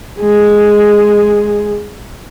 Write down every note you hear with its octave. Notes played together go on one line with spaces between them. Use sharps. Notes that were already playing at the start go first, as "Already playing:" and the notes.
G#3 G#4